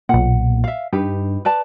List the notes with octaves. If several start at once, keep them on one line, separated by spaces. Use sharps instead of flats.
B1 A#2 F#5
E5 F5
G2 D#4 G4 B4
B4 D5 A5